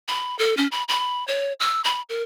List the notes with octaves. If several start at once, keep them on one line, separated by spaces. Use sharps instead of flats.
B5
A4
C#4
B5
B5
C#5
E6
B5
A#4